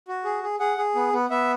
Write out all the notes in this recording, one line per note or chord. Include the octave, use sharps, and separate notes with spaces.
F#4
G#4
G#4
G#4 F#5
G#4
B3
B3
B3 E5